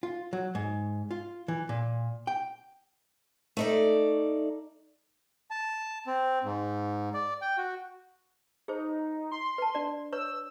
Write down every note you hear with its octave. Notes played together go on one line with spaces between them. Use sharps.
F4
F#3
G#2
F4
E3
A#2
G5
A3 D#4 D5
A5
C4
G#2
D5
G5
F#4
D#4 G#4 C5
C6
B4 A5
D4 D5
B4 C#5 C#6 E6